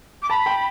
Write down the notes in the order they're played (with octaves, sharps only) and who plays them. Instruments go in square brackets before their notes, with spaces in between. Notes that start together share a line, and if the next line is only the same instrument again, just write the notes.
[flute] D6
[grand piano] A5 [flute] B5
[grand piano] G5